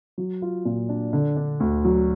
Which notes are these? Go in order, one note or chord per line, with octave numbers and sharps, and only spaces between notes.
F#3
F4
A#2
D4
D3
D4
D2
F#3